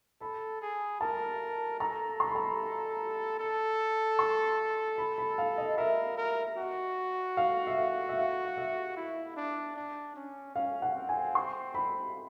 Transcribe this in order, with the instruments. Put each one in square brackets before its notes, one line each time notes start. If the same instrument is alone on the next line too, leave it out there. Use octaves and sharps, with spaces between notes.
[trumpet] A4 [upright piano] B5
[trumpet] G#4
[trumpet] A#4 [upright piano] A5
[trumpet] A4 [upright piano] A#5
[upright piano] C6
B5
A#5
B5
[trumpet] A4
[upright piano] C6
B5
B5
F5
D#5
[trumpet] A#4 [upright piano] E5
[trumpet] A#4
F#4
[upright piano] F5
E5
F5
E5
F5
F5
E5
[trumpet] E4
D4
D4
C#4
[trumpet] C#4 [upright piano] F5
[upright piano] F#5
[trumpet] C4
[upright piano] G#5
C6
B5